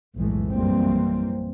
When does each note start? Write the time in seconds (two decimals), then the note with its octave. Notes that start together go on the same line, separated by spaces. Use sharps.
0.16 B1 F2 A2 E3 G#3 A3
0.52 A#1 F#2 E3 G3 A#3 C4